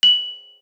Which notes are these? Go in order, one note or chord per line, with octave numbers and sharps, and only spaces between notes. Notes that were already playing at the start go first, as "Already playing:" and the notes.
F#7